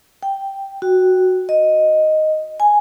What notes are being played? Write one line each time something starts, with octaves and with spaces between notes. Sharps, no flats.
G5
F#4
D#5
G#5